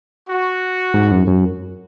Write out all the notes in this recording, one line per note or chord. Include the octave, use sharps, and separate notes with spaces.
F#4
G#2
F#2
F#2